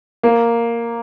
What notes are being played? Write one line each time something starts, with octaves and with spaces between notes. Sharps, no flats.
A#3